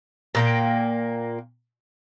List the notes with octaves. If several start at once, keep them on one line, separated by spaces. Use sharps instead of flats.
A#2 A#3 G5